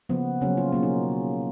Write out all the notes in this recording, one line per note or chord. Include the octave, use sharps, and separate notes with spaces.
C#3 F3 A#3 B3
C#3 F#3 A#3 C#4
F4
B2 F#3 A#3 C#4
D#4